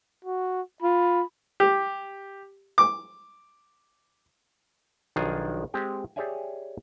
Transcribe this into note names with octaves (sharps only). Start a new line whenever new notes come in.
F#4
F4 B5
G4
D6
B1 D#3 F3 D4 G#4 F5
G#3 C4 G4 G5
G4 G#4 C#5 D5 E5 G#5